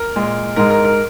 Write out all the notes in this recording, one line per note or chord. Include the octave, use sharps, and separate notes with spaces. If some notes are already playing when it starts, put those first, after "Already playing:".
Already playing: A#4
A#2 G#3
G#2 G#3 A#4
A#4
A#4